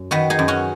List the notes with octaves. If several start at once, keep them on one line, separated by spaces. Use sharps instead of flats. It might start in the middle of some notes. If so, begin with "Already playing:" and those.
Already playing: F#2
D#3 F#4 B4
D#4 G#4
F#2
C#4 F#4